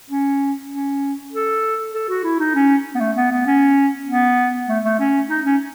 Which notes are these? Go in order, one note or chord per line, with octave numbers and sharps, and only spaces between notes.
C#4
C#4
A4
A4
F#4
E4
D#4
C#4
B3
A3
B3
B3
C#4
B3
A3
A3
C#4
D#4
C#4